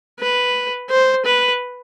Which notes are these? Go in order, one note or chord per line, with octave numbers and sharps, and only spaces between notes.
B4
C5
B4